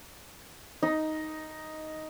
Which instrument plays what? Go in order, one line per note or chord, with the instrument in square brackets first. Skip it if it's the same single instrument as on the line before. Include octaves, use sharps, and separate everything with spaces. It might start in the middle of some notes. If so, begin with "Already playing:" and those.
[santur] D#4